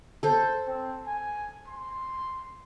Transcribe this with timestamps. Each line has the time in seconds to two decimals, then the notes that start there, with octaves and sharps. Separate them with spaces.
0.23 A4 C5
0.67 C4
1.07 G#5
1.68 C6